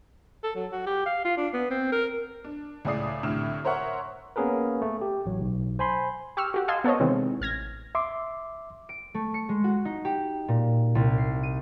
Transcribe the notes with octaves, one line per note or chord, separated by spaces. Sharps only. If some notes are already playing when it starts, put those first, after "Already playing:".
A4
F#3
F#4
G4
F5
F4
D4
B3
C4
A#4
D4
C#2 A2 G#4 D5 D#6 C7
C2 A2 D3 F6 E7
A#4 C5 C#5 E5 F#5 C#6
A#3 B3 C#4 G#4 A#4 B4
A3
G4
A1 F#3
B1
C5 G#5 B5 C6
G4 C#6 E6 F6
F#4 G4 F#5
D#5 F5 G#5 A5 C6 E6
B3 A4 C5 C#5 D#5
C3 D#3 E3 G#3 C4
A1 F6 G#6 A#6
E5 C6 D6
D7
A3
C#7
G#3
F#4
D#4
G4
A#2
C2
C7
D#7